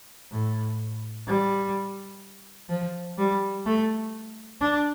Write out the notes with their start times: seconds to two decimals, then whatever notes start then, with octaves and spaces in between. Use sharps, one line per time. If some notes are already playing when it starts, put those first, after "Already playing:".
0.31 A2
1.27 G3
2.69 F3
3.18 G3
3.66 A3
4.61 D4